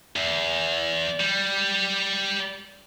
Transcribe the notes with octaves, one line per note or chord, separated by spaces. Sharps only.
E2
G3